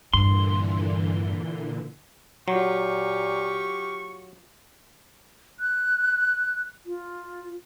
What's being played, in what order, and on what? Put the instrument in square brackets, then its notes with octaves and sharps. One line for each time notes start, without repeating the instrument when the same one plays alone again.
[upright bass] E2 G2 [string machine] A#2 D3 E3 [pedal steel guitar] C6
[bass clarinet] A#2 [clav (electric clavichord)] F#3 [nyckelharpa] F4 G4 [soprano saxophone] C#6
[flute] F#6
F4